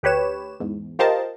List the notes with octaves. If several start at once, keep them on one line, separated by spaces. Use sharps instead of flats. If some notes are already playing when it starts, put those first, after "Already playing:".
D2 G4 B4 C#5 E7
E2 G#2
F4 G4 A#4 C5 D#5 A5